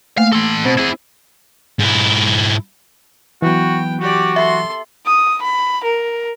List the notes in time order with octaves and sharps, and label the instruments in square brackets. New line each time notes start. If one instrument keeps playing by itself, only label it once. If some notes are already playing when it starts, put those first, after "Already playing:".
[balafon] A3 A#3 [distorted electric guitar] F5
[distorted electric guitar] A4 C6
[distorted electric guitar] B2 [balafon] C4 C5
[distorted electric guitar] E4 G#4
G#2 E4
[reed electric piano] E3 F#3 [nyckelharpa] B3 G5 [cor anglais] F#4
[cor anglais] F#4 [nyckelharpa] G4 D5
[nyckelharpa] A4 C6 [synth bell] E5
[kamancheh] D#6
B5
A#4